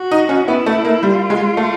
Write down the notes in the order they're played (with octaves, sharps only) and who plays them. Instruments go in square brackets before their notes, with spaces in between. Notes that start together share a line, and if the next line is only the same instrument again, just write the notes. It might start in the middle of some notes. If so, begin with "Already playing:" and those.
Already playing: [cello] F#4
[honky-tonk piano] D#4
C#4
[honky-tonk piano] B3 [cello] E4
[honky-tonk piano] A3
A#3
[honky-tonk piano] G3 [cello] F4
[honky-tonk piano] G#3
A3